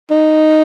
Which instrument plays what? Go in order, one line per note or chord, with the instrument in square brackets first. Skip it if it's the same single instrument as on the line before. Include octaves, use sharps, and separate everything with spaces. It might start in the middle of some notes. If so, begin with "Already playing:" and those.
[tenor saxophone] D#4